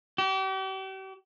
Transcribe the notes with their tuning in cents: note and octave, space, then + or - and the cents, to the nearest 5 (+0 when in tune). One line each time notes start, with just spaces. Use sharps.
G4 -40